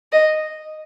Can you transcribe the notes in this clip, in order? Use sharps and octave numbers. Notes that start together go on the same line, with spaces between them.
D#5